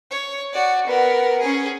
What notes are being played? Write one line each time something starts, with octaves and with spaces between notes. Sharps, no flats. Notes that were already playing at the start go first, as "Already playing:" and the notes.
C#5
F#4 D5
B3 A#4
C#4 G#4